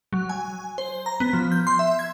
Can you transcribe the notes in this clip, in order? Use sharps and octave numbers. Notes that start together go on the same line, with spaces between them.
F#3
G#5
C5
A#5
B3
F3
G6
C6
E5
G#6